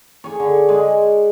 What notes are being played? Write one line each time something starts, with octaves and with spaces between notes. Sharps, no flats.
G#4 C#5
D3
G#3 G#5